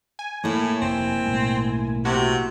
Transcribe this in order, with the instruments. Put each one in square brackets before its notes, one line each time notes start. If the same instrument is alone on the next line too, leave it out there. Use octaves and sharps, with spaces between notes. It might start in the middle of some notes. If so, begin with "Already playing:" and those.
[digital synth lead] G#5
[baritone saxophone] A2 [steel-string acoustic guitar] A#3 E4
[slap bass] F1 F2 C3 [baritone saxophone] C4
[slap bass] B1 A2 G#3
[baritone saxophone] C3 [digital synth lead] F#4